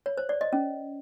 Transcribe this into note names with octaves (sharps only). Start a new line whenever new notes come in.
C#5
C5
D5
D#5
C#4